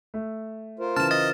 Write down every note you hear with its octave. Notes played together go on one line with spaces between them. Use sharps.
A3
F4 A#4 C5
C#3 E3 A5 F6 E7
D#5 A6